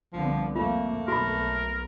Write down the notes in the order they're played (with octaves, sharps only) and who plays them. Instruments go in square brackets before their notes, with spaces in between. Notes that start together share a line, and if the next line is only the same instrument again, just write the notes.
[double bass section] C2 D3 B3 [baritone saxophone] F3
[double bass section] F2 C3 A#3 [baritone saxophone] A3 [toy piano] F4
[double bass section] B1 [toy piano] F#4 A#5 B5 [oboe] A#4